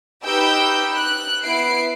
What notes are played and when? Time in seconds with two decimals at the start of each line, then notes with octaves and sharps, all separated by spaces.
0.24 D#4 G4 B4 G5 E6 G6
0.94 F#6
1.42 B3 E4 C7 D7